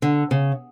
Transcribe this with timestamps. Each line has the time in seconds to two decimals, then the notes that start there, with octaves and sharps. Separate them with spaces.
0.02 D3
0.31 C#3